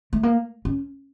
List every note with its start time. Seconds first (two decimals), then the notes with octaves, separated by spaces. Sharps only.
0.13 A3
0.23 A#3
0.65 C#4